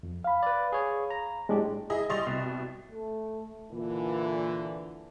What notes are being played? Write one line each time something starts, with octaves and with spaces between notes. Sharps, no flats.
F2
F5 B5
B4 D5
G#4 C#5
A#5
A2 G#3 D4 G4
E4 G#4 D#5
G3 D#5 C6 C#6 A6 F7
C2 B2
A3
A#2 D3 E3